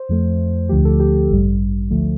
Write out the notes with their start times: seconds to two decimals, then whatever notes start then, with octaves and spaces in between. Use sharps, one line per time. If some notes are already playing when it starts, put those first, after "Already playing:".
Already playing: C5
0.09 F2 F3 A3
0.69 D2 D3 F3 A3 G4
0.85 A4
1.00 G4
1.30 A1 G2 G3
1.91 D2 D3 F3 A3